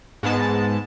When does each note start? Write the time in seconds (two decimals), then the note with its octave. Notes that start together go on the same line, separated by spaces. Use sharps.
0.23 G#2 G#3 B3 A5